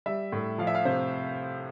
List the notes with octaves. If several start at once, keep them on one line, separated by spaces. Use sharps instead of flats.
G3 E5
A2
F3 F5
E5
F5
C3 C5